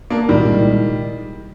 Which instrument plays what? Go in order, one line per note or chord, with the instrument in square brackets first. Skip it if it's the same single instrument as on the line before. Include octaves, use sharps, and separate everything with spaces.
[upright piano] A#3 D4
[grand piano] C2 A#2 G#3 [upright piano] D#3 G3